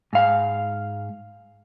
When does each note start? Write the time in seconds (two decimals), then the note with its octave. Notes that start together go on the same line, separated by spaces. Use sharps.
0.13 G#2 F5